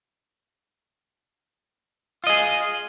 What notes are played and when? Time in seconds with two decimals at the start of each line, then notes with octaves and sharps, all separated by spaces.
2.24 F4
2.27 D#5
2.30 G#4